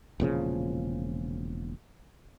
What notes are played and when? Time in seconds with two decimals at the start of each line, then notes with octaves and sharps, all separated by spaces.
0.20 E1 A#2 C#3 F3